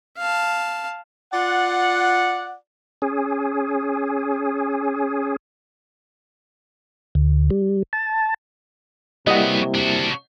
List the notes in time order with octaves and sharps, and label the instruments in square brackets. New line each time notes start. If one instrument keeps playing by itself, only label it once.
[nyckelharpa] F5 A5
[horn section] F4 D5 F#5
[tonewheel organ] C#4 G#4
D2
G3
A5
[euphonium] C3 [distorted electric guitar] F#3 B3 [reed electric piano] G3 A#3 E4 [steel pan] D#5 F#5
[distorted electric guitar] D4 F#4